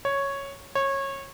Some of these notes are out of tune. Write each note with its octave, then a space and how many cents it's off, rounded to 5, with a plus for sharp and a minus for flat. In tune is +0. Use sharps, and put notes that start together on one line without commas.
C#5 +0
C#5 -20